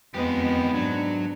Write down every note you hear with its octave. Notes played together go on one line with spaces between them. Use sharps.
F2 G#3 B3 D#4 G4
G#2 F#3 D4